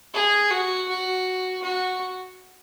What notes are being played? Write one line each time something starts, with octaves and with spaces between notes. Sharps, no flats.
G#4
F#4
F#4
F#4